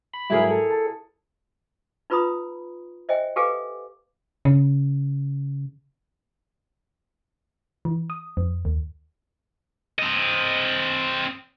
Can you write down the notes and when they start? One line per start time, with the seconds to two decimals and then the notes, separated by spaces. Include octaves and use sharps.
0.14 B5
0.30 G#2 F#3 G3 E4 G#4 A#4
0.51 A4
0.71 A5
2.10 D#4 F4 B4 A#5 B5 D#6
3.09 C5 D#5 E5 G5 G#5
3.36 G4 A4 B4 F5 G#5 D6
4.45 C#3
7.85 E3
8.10 D#6
8.37 F2
8.65 D#2
9.99 C4 D#5